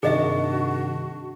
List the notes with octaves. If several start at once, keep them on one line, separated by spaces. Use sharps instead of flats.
G2 C3 D#3 D4 F#4 G#4 D#5 E5